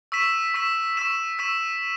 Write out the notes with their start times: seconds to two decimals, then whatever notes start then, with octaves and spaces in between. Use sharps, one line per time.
0.12 C#6 E6 B6 E7
0.54 C#6 E6 B6 E7
0.97 C#6 E6 B6 E7
1.39 C#6 E6 B6 E7